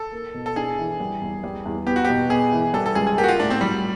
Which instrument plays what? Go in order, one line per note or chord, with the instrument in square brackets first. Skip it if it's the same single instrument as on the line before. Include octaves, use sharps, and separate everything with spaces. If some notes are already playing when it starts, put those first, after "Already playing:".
Already playing: [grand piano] A4
[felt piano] A#3
B2
[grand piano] A4
[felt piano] D4 [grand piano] G#4
[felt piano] E3
G3
E2
G3
E2
[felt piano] B3 [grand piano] G4
[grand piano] F#4
[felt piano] B2 [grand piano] G4
[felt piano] B3 [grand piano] G#4
[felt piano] E3
[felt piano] G3 [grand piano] A4
[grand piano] A4
[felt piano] C#2 [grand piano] G#4
[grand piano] G#4
[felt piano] A#3 [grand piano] G4
[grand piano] F#4
F4
[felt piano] A2 [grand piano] D4
[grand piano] C4
[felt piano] F#3 [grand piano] G3